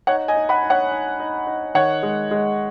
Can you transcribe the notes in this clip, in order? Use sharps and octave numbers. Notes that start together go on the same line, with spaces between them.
D#4 C#5 F#5
D#5 G#5
D#4
F#5 B5
D#4
C#5 F#5
D#4
D#4
D#4
D#3 C#5 F#5
G#3
G#3